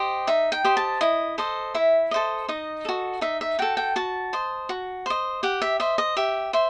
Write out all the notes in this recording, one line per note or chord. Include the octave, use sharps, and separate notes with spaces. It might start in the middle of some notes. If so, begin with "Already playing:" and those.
Already playing: G4 C5 D#5
D#4 E5
G5
G4 C5 D#5
A5
E4 D#5
A4 C5 D#5
E4 E5
A4 C5 D#5
D#4 D#5
F#4 A4
D#4 E5
E5
F#4 A4 G5
G5
F#4 A5
C5 D#5
F#4
C5 D#5
G4 F#5
E5
C5 D#5 E5
D#5
G4 E5
C5 E5